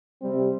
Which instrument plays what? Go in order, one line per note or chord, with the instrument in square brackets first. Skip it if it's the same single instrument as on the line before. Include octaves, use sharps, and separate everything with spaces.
[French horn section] C3 G3 C4